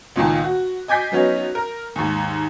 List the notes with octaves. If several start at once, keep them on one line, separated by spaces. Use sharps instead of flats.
C#2 A#2 D#3 A5
F#4
D#5 G#5 D6 G6 B6 C7
F#3 B3 C#4 D#4
A#4
D#2 G#2